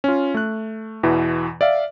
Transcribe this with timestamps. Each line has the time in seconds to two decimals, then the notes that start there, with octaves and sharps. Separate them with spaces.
0.04 C#4 F4
0.34 A3 F#6
1.03 E2 B2 E3
1.61 D5 E5 F5